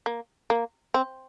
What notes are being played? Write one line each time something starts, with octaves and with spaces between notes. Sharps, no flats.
A#3
A#3
C4